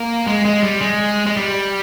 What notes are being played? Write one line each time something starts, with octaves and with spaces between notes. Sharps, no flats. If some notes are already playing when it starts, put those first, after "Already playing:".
Already playing: A#3
G#3
G#3
G3
G#3
G#3
G3